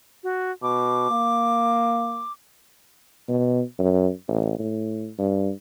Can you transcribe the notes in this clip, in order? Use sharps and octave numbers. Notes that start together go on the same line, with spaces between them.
F#4
B2 D6
A#3
B2
F#2
A1
A2
G2